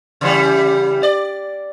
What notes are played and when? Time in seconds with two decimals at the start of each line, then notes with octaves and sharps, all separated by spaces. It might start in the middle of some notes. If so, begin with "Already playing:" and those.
0.21 C#3 E3 G3
1.03 D5